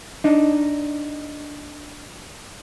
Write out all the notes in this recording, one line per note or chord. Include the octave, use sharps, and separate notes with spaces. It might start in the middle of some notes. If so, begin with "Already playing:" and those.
D4 D#4